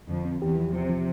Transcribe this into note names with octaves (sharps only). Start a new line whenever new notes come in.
F2 D3 F3
C4
E2 E3 G4
F3
C3 F3
F3